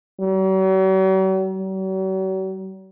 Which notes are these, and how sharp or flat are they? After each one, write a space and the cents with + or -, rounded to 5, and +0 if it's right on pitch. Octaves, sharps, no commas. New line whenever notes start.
F#3 +45
F#3 +45